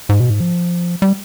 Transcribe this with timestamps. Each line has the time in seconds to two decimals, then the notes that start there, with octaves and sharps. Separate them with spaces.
0.09 G#2
0.20 B2
0.30 G#2
0.40 F3
1.02 G3